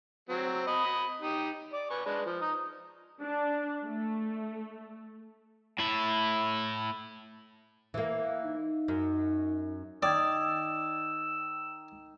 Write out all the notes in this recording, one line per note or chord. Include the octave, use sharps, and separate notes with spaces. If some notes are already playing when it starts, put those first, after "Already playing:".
F#3 C4
D#5 B5 D#6
D#4 G4
D5
B4 G#5 C#6
G#3 D4 B4
F3
D#4 D#6
D4
A3
A2 E4
E3 A#3
D#4
F#2
D#3 D5 D#6 E6 G#6